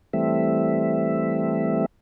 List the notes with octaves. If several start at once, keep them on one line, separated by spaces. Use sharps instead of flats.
E3 G3 A3 C4 E5